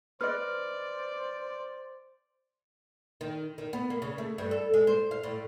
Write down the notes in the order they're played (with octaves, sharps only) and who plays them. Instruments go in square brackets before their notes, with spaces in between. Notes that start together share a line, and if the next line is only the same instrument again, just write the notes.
[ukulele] B4 D#5 [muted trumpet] C5 [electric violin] D5 [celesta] F6
[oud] D#3
D#3
B3
A#3
C#3
A3
G2
A4
G#3
C5
F5
A2